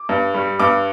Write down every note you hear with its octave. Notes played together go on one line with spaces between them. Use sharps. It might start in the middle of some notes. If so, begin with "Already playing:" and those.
Already playing: D6
G2
G3
G2 D6